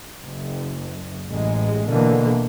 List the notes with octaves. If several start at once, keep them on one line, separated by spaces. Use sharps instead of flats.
F#1
A1 A2 G#3
B2 D3 E3 A#3